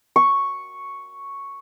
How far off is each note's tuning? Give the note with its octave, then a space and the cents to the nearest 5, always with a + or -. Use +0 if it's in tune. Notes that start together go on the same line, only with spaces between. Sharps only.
C#6 +0